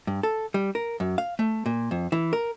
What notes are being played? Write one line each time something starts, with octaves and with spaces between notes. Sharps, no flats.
G2
A4
G3
A#4
F#2
F5
A3
A#2
F2
E3
A#4